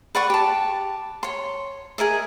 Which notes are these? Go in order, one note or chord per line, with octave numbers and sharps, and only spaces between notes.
B4 D5 F#5 C#6
G4 A5
C#5 C6
G#4 A#4 D#5 E5